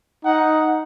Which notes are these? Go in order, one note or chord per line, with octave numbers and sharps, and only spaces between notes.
D#4 F#5